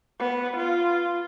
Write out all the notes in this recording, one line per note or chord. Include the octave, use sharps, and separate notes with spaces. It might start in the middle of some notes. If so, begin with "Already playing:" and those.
B3
F4